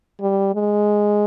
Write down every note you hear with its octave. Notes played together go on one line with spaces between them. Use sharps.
G3
G#3